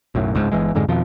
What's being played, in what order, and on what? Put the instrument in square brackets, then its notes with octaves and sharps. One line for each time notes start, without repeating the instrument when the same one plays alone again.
[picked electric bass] B1 F#2 A2
D1 C#2 G#2
G1 C#2 E3 G#3
F2 G#2 D3 G#3
F2 B2 D#3 F3